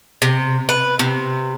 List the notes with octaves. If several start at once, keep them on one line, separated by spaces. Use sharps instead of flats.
C3
B4
C3